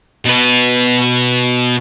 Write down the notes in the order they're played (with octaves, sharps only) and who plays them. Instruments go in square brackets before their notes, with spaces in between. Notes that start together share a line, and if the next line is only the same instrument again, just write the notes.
[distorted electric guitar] B2 B4